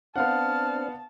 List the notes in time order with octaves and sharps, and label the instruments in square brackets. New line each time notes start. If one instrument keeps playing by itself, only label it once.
[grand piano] B3 F5 F#5 [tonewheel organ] C4 D4 [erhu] A5 [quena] F6